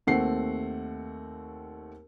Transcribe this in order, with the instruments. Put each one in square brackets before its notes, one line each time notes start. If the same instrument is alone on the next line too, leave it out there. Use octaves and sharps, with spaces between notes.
[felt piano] D#2 A3 C4 F#5 C7